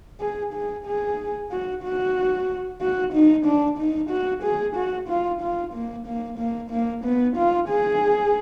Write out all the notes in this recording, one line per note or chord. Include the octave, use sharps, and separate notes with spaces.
G#4
G#4
G#4
F#4
F#4
F#4
D#4
D4
D#4
F#4
G#4
F#4
F4
F4
A#3
A#3
A#3
A#3
B3
F4
G#4